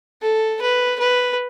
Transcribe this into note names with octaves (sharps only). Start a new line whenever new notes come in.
A4
B4
B4